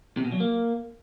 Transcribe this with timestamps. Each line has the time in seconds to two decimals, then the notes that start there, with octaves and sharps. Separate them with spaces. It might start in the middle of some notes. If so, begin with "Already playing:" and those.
0.17 C3
0.25 B2
0.32 F#3
0.40 A#3